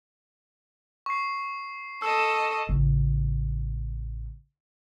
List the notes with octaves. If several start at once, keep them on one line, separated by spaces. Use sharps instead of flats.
C#6 C7
A4 D#5 E6 E7
A1 C#3